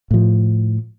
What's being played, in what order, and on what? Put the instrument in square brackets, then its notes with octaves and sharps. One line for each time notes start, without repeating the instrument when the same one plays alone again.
[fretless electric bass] A2 F3